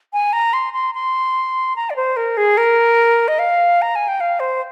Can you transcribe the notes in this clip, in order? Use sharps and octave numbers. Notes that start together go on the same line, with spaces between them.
G#5
A#5
C6
C6
C6
A#5
D5
C5
A#4
G#4
A#4
D#5
F5
A#5
G#5
G5
F5
C5